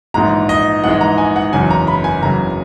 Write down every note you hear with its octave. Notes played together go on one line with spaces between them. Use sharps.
A#1 G#2 E3 G#3 A#5
D#5
A#1 G#2 E3 G#3 F#5
A#5
G#5
F#5
F#1 E2 C#3 F#3 G#5
A#5
B5
G#5
F#1 E2 C#3 F#3 A#5